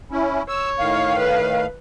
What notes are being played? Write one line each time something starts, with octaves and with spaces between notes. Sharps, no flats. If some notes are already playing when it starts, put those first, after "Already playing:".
C#4 E4
C#5 E6
A2 D#3 F5
B4